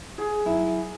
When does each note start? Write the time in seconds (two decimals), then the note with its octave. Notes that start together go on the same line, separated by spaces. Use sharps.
0.18 G#4
0.45 F#3 E4